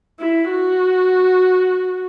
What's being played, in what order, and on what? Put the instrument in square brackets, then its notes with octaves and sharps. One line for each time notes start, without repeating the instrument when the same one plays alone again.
[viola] E4
F#4